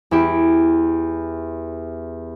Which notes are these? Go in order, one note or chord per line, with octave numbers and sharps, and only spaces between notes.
E2 E4 G4